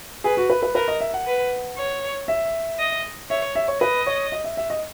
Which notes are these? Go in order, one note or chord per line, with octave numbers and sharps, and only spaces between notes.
G#4 B4
F#4
B4
B4
A#4 B4
D#5
E5
F#5
B4
C#5
E5
D#5
C#5 E5
E5
C#5
B4 D#5
C#5
D#5
E5
E5
D#5